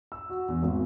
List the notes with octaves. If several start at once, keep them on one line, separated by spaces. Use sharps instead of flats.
E6
F#4
E2
G#1